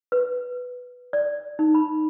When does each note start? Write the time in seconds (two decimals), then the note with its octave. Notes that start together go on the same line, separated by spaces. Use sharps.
0.12 B4
1.13 D5
1.59 D#4
1.75 B5